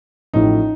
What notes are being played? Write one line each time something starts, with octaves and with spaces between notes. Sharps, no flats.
A1 A2 F3 D#4